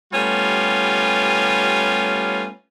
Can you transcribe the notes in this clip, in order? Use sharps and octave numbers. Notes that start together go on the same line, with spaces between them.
G3 A3 B3 C#4 F4 G4